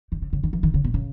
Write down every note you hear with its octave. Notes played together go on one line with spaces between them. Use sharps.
D#3
C#3
C#3
D#3
E3
D#3
C#3
B2
C#3